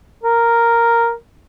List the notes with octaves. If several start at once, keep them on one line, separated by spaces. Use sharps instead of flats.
A#4